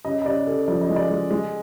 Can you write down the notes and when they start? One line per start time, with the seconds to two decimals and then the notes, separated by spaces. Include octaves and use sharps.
0.05 C#3 D#5
0.22 D#5
0.26 C#3 D5
0.47 C#3 A4
0.68 F3 D5
0.81 D#5
0.89 G#3
0.96 D5
1.10 G#3
1.31 G#3